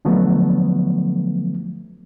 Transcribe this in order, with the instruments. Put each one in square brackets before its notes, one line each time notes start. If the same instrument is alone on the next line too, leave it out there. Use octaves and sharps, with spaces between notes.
[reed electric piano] D3 F3 F#3 A3 B3